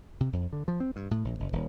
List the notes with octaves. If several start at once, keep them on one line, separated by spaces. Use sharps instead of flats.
C3
F2
D3
F3
C4
G2
A2
A#1
F#1
D#1